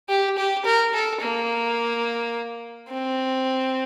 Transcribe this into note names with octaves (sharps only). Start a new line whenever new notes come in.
G4
G4
A#4
A4
A#3
C4